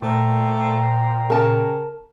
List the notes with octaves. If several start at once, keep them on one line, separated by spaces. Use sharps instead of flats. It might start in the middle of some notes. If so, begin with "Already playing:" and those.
A#2 A3 C5 G5 A#5
C#3 A#4 A5